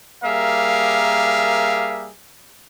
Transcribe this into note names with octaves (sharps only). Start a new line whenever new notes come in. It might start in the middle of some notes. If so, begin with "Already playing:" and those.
G3 A#3 G#4 A#4 E5 F5